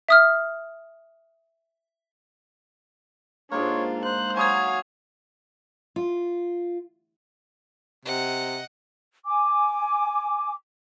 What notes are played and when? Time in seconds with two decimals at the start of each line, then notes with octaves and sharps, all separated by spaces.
0.08 E5 D#6 F6
3.51 G#2 G#3 A#3 D4 F4 C#5
4.05 C5 F#6
4.37 F#3 F5 G#5 C#6 D#6 G#6
5.96 F4
8.05 C3 D#5 F#5
9.26 G#5 D6